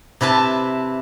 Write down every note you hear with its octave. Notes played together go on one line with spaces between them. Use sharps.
C3 E4 B4 A5